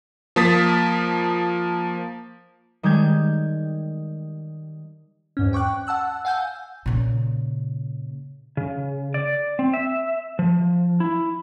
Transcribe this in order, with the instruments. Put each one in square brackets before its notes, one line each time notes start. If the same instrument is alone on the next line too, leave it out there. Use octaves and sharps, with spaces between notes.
[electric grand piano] F3 A#3 A5 D#6 A6 B6
[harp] D#3 G3 G#3 G6 G#6
[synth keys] E2 G#2 C#4
G5 C#6 D6 F#6
F#5 A5 E6 F#6
F5 F#5 G#5 E6 G6
[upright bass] A#2 C#3
[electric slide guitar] C#3
D5
C4
E5
F3
E4